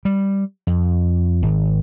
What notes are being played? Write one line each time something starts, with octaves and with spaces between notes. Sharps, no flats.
G3
F2
G#1